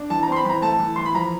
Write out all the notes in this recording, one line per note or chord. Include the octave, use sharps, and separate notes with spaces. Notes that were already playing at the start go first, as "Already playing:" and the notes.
Already playing: D4
E3 A5
A#5
C4 C6
B5
E3 A#5
A3 A5
E3
E3 C6
B5
F3 A#5